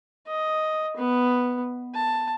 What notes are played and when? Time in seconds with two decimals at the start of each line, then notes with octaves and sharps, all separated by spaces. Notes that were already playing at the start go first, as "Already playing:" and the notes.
0.27 D#5
0.97 B3
1.95 A5